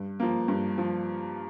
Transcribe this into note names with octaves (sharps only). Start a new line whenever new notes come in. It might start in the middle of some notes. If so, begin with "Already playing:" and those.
Already playing: G2
F3 A#3
G2
F3